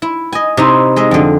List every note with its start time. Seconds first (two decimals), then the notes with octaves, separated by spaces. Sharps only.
0.02 E4
0.33 D#5 G#5
0.57 C3 D#4 E4
0.96 G#3 D#5 E5
1.11 F2 D3